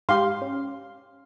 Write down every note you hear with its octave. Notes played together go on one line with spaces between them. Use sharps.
G#2 G4 F5 C6
C#4